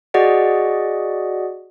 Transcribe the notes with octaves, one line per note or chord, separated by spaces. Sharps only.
F#4 G#4 D5 D#5 F#5